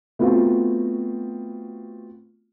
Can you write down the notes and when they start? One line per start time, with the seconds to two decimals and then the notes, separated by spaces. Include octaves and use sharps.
0.19 A3 B3 C4 F4 F#4